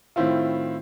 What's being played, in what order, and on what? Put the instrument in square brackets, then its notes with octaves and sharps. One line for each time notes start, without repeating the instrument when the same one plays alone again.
[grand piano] A2 D#3 C4 E4 F4